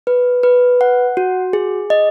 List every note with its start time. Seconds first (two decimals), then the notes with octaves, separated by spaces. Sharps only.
0.07 B4
0.43 B4
0.81 F#5
1.17 F#4
1.53 G#4
1.90 D#5